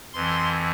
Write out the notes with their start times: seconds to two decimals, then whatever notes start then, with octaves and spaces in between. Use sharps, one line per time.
0.13 F2 E3 C6